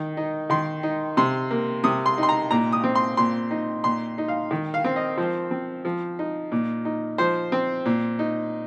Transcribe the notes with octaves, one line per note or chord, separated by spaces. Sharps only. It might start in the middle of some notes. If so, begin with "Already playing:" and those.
Already playing: D#3
D#4
D#3 C6
D#4
C3 C6
A#3
C3 D#6
C6
D#4
C6
A#5
A#2 A#5
D#6
C4
C6
A#2 C6
D#4
A#2 C6
D#4
F5
D#3
F5
C4
D#5
F3 C5
C4
F3
D#4
A#2
D#4
F3 C5
C4
A#2
D#4